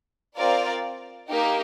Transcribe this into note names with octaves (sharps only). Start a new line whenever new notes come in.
C4 F4 A#4 D5 F5
A#3 D#4 G4 A#4